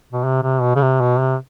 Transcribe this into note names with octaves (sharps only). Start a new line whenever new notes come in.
B2
C3
C3
B2
C#3
C3
B2
C3